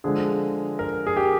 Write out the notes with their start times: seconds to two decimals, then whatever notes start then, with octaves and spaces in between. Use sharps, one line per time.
0.04 D3 F3 G#3 G#4
0.79 A#4
1.07 G#4
1.17 G4